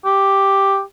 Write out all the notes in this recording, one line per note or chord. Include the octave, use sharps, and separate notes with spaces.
G4